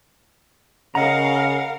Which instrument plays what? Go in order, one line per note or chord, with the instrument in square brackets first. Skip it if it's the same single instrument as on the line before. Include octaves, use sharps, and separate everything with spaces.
[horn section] C#3 [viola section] A#4 F5 [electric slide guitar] D#5 A#5 [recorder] F#5